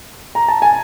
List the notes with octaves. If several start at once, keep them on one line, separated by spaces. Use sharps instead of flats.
A#5
A5
G#5